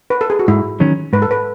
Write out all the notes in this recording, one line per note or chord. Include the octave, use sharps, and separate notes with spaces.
B4
A4
G#4
F#4
G#2 E4
D#3 F#3 C#4
G#2 B4
A4
B4